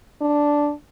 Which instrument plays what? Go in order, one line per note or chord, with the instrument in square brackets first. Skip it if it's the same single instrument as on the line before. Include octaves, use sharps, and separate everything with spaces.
[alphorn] D4